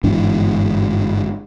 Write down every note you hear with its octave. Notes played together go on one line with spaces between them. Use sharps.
G1 G#2 E3 D4